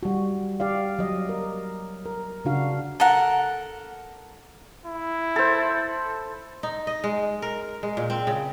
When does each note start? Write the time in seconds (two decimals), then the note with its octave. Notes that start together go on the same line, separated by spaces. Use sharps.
0.03 G3 F#4
0.60 G4 D5 F5
0.99 F#3 D#5
1.29 A#4
2.06 A#4
2.45 C#3 D4 F#4 F5
3.00 A4 A#4 F#5
4.86 E4
5.36 A4 C5
6.63 D#4
6.87 D#5
7.04 G#3
7.42 A#4
7.83 G#3
7.97 A#2
8.10 C4
8.27 C#3